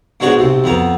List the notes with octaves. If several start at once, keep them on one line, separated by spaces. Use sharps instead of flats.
G#2 B2 G#3 D4 F#4 C#5
B1 C3
F2 B3 A#5